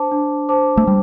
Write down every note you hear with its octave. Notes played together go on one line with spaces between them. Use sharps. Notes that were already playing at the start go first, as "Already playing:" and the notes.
Already playing: D4 C5 A5 D6
D4
C5 A5 D6
A3
G3